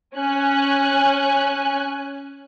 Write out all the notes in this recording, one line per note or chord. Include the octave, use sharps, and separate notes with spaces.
C#4 G#5 F#6